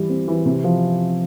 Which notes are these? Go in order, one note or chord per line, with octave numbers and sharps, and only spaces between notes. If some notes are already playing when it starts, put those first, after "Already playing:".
Already playing: E3 G3 E4
C4
E3
C3
F3